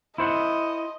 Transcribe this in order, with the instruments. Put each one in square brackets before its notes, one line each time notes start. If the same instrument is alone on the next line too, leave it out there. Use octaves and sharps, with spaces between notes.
[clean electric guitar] E4 C5 F#5 [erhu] D#5